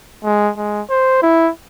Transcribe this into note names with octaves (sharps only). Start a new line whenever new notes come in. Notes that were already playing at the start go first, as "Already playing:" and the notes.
G#3
G#3
C5
E4